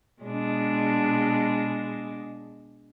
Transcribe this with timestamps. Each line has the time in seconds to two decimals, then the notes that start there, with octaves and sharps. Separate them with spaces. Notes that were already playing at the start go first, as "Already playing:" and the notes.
0.22 B2 G#3 D4